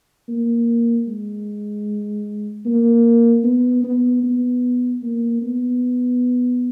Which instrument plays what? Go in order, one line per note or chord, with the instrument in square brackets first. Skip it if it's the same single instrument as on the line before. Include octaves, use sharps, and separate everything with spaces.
[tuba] A#3
G#3
A#3
B3
B3
B3
A#3
B3